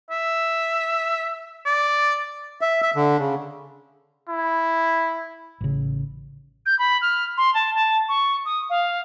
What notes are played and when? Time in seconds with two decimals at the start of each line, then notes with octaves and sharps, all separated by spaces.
0.11 E5
1.66 D5
2.61 E5
2.82 E5
2.95 D3
3.19 C#3
4.29 E4
5.61 A1 C#3
6.66 G6
6.79 B5
7.02 F6
7.37 C6
7.54 A5
7.74 A5
8.09 C#6
8.46 D#6
8.70 F5